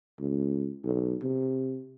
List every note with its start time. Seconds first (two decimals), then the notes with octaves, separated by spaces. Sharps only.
0.19 C#2
0.84 B1
1.22 C3